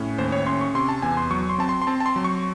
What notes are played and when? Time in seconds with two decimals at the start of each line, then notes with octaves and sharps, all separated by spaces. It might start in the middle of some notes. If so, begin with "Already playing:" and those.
Already playing: A2 C#4
0.18 D#2 C5
0.32 C#5
0.46 C#4 C6
0.61 C#6
0.75 C3 C6
0.89 A5
1.02 E2 G#5
1.17 C6
1.31 F#3 C#6
1.49 C6
1.58 C4 A5
1.69 C6
1.82 C6
1.87 C4 A5
2.00 A5
2.06 C6
2.16 F#3
2.24 C#6